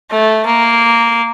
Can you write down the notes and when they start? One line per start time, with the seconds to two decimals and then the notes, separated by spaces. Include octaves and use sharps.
0.11 A3
0.46 A#3